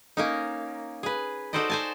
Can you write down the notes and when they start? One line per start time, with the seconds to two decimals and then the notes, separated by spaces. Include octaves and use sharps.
0.17 A#3 C#4 D#4
1.03 G#4 B4
1.53 D#4 F#4 A4 C5 D5 D#5
1.70 C5 G#5 A5